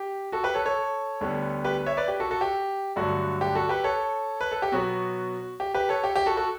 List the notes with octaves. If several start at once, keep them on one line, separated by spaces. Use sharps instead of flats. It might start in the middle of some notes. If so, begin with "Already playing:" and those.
Already playing: G4
F#4 A4
G4 B4
A4 C#5
A4 C#5
D2 D3 G3 B3
G4 B4
C#5 E5
B4 D5
G4
F#4 A4
F#4 A4
G4
G2 D3 F#3 A3 F#4
G4
F#4 A4
G4 B4
A4 C#5
B4
A4
G4
B2 F#3 B3 F#4
G4
G4 B4
A4 C#5
G4
G4
F#4 A4
F#4 A4